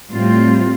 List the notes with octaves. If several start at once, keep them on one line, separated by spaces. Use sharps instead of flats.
A2 G3 C4 F4